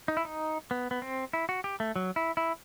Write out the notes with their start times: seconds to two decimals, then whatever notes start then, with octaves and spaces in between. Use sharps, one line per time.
0.08 D#4
0.17 E4
0.25 D#4
0.71 B3
0.91 B3
1.02 C4
1.33 E4
1.49 F#4
1.64 G4
1.80 A3
1.96 F#3
2.16 E4
2.37 E4